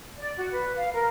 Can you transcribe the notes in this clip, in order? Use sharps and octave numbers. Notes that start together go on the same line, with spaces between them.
D5
F#4
B4
F5
A#4